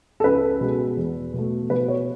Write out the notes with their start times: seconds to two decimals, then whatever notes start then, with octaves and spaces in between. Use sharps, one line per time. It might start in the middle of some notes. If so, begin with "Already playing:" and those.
0.20 A4
0.24 C#2 B4
0.60 B2 G#3
0.97 E2
1.34 B2 A3
1.70 B2 B4
1.88 C#5